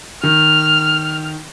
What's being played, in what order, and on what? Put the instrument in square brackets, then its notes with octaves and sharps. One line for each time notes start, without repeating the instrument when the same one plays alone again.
[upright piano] D#3 [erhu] F6